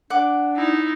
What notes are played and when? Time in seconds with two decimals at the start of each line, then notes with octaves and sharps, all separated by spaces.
0.10 D4 F#5 D6
0.56 D#4 E4